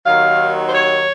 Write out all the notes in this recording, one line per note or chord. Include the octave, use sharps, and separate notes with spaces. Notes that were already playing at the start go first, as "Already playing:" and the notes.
D#2 D#3 F#3 F5
C5
C#5